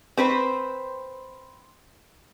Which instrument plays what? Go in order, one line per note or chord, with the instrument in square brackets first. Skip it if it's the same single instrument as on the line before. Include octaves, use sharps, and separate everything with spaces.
[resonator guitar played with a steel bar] C4 B4 C5